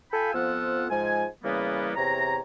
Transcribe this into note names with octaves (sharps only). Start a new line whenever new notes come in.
F4 A4 F5 G5 G#5 B5
F2 F3 B3 F4 F#5 E6
G#2 F3 G#3 G#5
C#3 E3 G3 A#3 B3
E2 C3 C#5 A#5